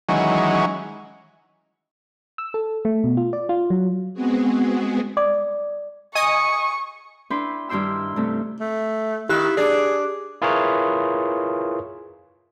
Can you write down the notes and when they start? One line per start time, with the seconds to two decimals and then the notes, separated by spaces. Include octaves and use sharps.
0.09 D#3 E3 F#3 G#3 C#4
2.38 E6
2.54 A4
2.85 A3
3.04 B2
3.17 F4
3.33 D5
3.49 F4
3.70 F#3
4.14 G#3 B3 C4 F#4 G#4
5.17 D5 D6 D#6
6.15 D#5 G#5 C#6 D#6
7.30 D4 E4 B4 G5 C6
7.69 G2 D#3 E4 G5 C6 E6
8.16 G2 C3 A3 C4
8.60 A3
9.29 D#3 E4 G4 F#6
9.57 D4 G#4 D5
10.42 E4 F4 G#4 A#4 B4 C#5